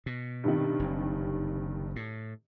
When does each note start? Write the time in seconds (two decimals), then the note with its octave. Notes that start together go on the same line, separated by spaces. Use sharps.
0.06 B2
0.44 G2 C3 D#3
0.79 F#1
1.96 A2